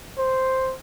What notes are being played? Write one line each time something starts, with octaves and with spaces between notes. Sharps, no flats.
C5